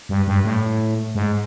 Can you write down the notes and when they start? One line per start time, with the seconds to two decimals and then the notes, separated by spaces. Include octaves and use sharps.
0.09 G2
0.27 G2
0.45 A2
1.15 G#2